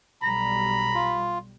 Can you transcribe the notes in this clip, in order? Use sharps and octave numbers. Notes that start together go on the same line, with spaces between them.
B1 G3 A#5 B5
F4